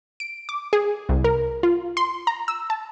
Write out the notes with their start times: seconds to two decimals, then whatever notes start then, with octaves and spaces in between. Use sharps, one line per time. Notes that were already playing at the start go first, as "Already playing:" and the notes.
0.20 D7
0.49 D6
0.73 G#4
1.09 C2
1.24 A#4
1.63 F4
1.97 C6
2.27 A#5
2.48 E6
2.70 A5